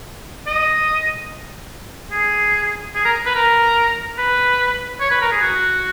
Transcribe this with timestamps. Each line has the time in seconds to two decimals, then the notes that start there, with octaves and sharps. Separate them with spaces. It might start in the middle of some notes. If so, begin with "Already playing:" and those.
0.47 D#5
2.11 G#4
2.95 G#4
3.05 A#4
3.26 B4
3.35 A#4
4.18 B4
5.00 C#5
5.11 B4
5.21 A#4
5.31 G#4
5.41 F#4